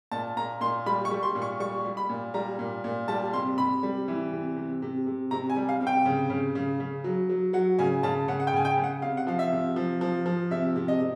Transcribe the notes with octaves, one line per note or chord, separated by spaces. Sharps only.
A#2 A5
A#2 A#5
A#2 C6
G3 B5
C#6
G3
C6
A#2
C#6
G3 C#6
G3
B5
A#2
G3 A#5
A#2
A#2
G3 A5
C3 C6
C3 B5
G3
E3
C3
C3
C3
C3
C3 A#5
G#5
G3
F5
C3
G5
C#3
C#3
C#3
C#3
F#3
F#3
F#3 F#5
C#3 G#5
C#3 A5
C#3 F#5
F#5
G5
C#3 G#5
G5
C#3
F#5
C3 F5
F#5
F3 F5
E5
C3
F3
F3
F3
C3 E5
C3
D#5
C3